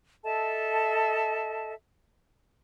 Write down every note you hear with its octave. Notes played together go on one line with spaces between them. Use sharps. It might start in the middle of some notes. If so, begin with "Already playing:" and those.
A4 D#5 E5 A5